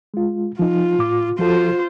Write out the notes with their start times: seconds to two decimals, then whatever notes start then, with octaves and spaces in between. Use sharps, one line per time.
0.14 G#3 F4
0.59 F3 D#4 F4
0.99 A2 D6
1.39 F3 F4 F#4 A4 C5